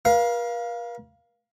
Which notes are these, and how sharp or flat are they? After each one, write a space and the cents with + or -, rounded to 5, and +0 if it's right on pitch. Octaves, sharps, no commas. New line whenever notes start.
A#4 +45 F5 +0